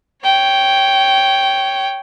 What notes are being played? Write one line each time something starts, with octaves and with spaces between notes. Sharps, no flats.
C#5 G5